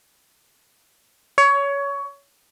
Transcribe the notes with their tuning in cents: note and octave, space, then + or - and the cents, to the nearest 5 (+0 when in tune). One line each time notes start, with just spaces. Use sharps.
C#5 +20